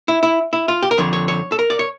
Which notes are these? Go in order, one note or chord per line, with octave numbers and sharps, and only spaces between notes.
E4
E4
E4
F4
G4
A#4
F2 D3 F3 C#5
C#5
C#5
A4
A#4
D5
C#5